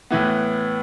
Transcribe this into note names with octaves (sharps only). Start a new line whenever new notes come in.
A2 E3 B3